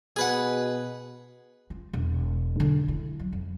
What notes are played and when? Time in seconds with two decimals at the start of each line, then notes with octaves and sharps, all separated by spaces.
0.16 B2 G#4 B4 F#5
1.70 F4
1.93 E1
2.60 D3
2.88 E4
3.19 F#3
3.33 F2